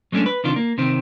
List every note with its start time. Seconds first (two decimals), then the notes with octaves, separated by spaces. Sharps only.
0.12 F#3 G#3 A3 C#4 D4
0.26 B4
0.44 C3 D#3 D4 F4
0.56 A#3
0.78 C3 D#3 C4